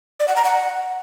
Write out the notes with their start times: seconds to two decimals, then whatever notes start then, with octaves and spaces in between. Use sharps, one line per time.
0.20 D5
0.28 F#5
0.36 A#5
0.44 F#5